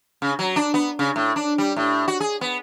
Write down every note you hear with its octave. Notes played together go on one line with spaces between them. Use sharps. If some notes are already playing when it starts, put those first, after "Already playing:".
C#3
F#3
D4
B3
C#3
A2
D4
G3
A2
F#4
G#4
B3